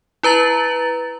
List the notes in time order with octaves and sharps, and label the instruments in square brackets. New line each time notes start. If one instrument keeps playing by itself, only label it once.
[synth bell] E4 B4 A#5 A6 F#7